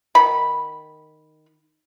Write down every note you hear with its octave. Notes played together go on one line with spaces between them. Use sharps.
D#3 B5